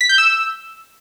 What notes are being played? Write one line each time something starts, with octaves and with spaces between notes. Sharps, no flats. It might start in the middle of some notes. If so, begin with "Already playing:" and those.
B6
G6
E6